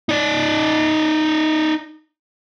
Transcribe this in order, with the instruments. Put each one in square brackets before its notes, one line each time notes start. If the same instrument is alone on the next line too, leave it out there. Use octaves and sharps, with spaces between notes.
[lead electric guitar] D#4 D5